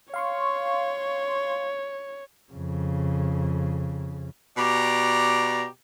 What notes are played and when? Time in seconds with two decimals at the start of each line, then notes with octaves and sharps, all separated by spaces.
0.14 C#5 F5 C6 C#6
2.52 F2 C#3
4.57 B2 G4 D5 A#5